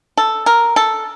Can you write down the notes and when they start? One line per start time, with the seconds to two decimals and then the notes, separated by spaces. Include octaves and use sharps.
0.17 A4
0.46 A#4
0.76 A4